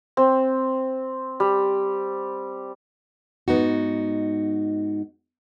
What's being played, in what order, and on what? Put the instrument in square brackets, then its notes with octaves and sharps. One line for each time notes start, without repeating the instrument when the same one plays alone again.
[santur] C4
G3
[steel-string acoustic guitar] G#2 B3 D#4 F#4